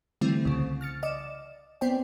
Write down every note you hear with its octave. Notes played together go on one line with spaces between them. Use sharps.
D3 E3 G3 A3 C4 E4
C2 C#3
F6 A6 C#7
D5 D#5 D6 E7
B3 C4 C5 D5 G5